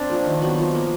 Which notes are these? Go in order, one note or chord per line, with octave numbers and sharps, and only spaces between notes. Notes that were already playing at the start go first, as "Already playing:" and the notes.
Already playing: C4 D4
F3 A#3
D#3
F#3 B3
F3
A#3